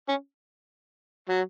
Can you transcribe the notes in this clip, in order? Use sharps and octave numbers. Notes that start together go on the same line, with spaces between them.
C#4
F#3